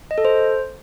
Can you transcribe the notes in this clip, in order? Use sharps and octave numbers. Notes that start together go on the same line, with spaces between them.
D#5
A4
C5